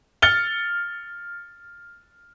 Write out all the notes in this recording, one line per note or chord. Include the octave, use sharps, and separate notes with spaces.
F6 A6 C#7 G7